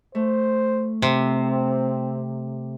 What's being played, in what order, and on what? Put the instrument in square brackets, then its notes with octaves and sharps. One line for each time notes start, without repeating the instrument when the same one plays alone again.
[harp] A3 [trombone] C5
[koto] C3 [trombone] C4